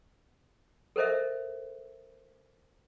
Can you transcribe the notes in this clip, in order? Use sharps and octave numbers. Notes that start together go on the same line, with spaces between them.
A4 A#4 C5 D#5 E5